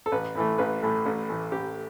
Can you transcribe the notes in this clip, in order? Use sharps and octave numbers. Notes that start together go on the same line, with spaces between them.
A4
A1 B4
A2 E3 A3
A1 B4
A2 E3 A3
A1
A2 E3 A3
A1 G4